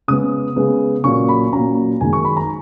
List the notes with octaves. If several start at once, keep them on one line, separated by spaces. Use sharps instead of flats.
C#3 G#3 B3 D#6
C#3 G#3 B3
A#2 F#3 A#3 C#4 C#6
B5
A#2 F#3 A#3 C#4 A#5
F#2 D#3 G#3 G#5
C#6
B5
A#5